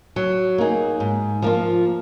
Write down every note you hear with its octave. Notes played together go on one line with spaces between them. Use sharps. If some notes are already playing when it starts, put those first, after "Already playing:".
F#3
A#3 D#4 G#4
G#2
F3 A#3 F4